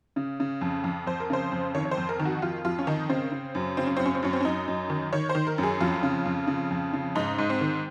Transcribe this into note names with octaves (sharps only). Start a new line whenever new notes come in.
C#3
C#3
F2
F2
F2 C5
A#4
C#3 C5
F2
D#3 C#5
C#5
C5
F2
A#4
D#3
F#4
F2 F4
F2 F4
C#4
D#3 D#4
C#3 C4
C#3
F#2
C#3 C4
C#4
F#2 C4
C#4
C4
F#2 C#4
C4
C#4
F#2 D#4
F#2
D#3
D#3 C#5
C5
D#3
A#4
F#2
G#4
F2 F4
C#3
F2
C#3
F2
C#3
G#2 D#4
G#2
C4
D#3